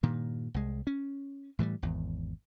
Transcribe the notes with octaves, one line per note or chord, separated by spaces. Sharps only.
G2 A#2 D#3
C2 G#3
C#4
A2 E3 F3 G3
G#1 E2